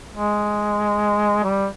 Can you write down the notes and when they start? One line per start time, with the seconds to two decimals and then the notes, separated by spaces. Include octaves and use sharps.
0.13 G#3
1.44 G3